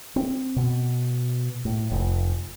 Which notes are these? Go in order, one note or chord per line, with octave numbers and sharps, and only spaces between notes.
C4
B2
A2
F1